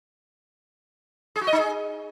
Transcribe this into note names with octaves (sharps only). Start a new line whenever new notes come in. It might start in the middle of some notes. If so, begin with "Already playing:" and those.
G#4
F#4
D#5
D#4
G#4